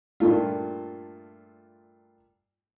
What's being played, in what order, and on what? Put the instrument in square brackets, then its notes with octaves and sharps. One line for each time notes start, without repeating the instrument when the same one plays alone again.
[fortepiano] G2 A#2 A3 F4